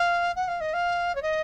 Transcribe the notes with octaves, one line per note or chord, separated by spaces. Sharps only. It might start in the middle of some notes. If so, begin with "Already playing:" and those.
Already playing: F5
F#5
F5
D#5
F5
C#5
D#5